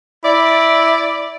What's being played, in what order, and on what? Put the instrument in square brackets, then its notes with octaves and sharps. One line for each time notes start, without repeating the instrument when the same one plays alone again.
[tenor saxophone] E4 [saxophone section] D5